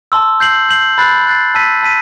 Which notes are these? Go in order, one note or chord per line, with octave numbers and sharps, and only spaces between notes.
A5 C6 E6
G6 C7 F#7
G6 C7 F#7
B5 F#6 A6 C7
B5 F#6 A6 C7
A5 E6 B6 D#7
A5 E6 B6 D#7